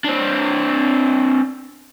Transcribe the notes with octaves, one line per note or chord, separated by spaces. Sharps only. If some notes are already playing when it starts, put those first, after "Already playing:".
C4 D4